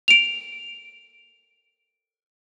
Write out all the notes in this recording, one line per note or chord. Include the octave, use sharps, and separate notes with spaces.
D7 F7